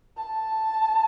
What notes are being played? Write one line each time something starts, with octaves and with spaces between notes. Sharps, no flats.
A5